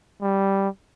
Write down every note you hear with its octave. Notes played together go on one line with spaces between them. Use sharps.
G3